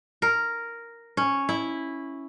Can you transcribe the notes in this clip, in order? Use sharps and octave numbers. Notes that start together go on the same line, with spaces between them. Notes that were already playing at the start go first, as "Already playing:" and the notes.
A#4
C#4
E4